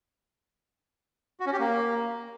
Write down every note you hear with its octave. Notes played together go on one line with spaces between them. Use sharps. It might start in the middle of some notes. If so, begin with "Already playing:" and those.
F#4
C#4
G4
A#3